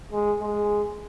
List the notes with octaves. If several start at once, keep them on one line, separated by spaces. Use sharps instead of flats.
G#3
G#3